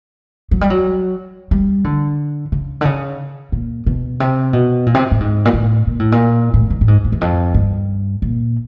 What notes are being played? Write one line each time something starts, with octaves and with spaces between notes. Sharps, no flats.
F#3
G3
F#3
G3
D3
C#3
D3
C#3
A#2
B2
C3
B2
A#2
C3
A2
G#2
A#2
A2
A#2
A2
A#2
A2
G#2
A2
G#2
A2
E2
F2
G2
A#2